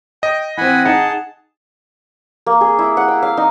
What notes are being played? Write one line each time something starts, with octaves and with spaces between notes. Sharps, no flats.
D#5 G5
E3 C4 F#5 G#5 B5
D#4 G#4 F#5 A5
A#3
G#4
E4
F#5
G5
F5
D#4